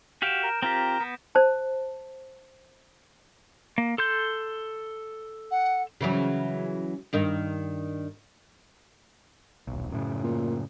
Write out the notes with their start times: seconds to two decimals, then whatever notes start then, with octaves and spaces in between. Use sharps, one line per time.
0.22 F#4 G4 F5 G6 D7 E7
0.43 A#4
0.62 C4 F4 G4 A#4 A#5 A#6
1.00 B3
1.35 C5 A5
3.78 A#3
3.98 A4 C6 G6
5.51 F#5
6.01 C#3 E3 F#3
7.13 G2 D#3 D#4
9.67 D#1 B1
9.92 F#2 A2 C#3
10.24 A#2